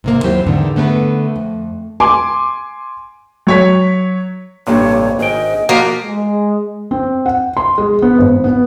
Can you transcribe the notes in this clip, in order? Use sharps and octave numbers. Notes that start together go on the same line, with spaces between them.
G#2 C3 A#3
D#2 F#3 C4 E4 G4 C5
E2 G#2 D3 D#3
D3 A3 B3 A#4 B4
F2
G#5 C6 D6
F#3 C#5 B6
A1 G2 C3 A#3 D4 C#5 C#6
G#1 G#4 D#5 G5 G#5
F3 A#3 F#4 G4 A5
G#3
C4
F#5
C6
G#3
B3
G#1
B3